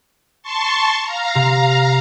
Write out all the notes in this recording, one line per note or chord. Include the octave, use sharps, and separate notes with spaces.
A5 C6 C#6
F5 A#5
C3